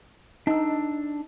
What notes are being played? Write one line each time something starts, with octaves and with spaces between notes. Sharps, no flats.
D4 D#4 E6